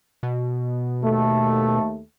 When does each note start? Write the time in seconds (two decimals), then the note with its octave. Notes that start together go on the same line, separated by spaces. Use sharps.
0.23 B2
1.03 D#2 A3